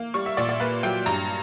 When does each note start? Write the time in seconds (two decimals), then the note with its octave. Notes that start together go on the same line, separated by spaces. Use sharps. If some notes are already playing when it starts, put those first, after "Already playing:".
Already playing: A#3
0.14 G3 C#6
0.26 E5
0.37 A#2 D5
0.49 D5
0.60 A#3 B4
0.83 F#3 G5
1.06 G2 A#5